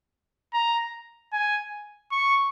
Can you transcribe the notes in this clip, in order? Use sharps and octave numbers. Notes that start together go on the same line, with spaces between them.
A#5
G#5
C#6